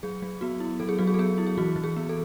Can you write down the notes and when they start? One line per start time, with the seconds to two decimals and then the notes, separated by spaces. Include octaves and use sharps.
0.03 F#3 G#4
0.22 F#3
0.41 B3 F#4
0.60 E4
0.80 F#3 A4
0.89 G#4
0.99 F#3 F#4
1.07 G#4
1.14 A4
1.19 B3 G#4
1.38 E4
1.47 G#4
1.58 E3 F#4
1.76 E3
1.84 G#4
1.96 B3
2.09 A4